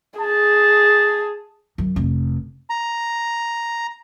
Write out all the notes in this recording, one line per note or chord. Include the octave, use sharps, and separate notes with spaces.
G#4 A5
F#2
F1
A#5